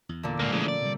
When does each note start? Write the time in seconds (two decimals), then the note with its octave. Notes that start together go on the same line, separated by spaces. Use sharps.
0.09 E2
0.23 A#2 D3
0.39 D1 C#2 G#2 A#3
0.52 E3 F3 G#3 A3 C#4
0.68 D5
0.82 C3 G3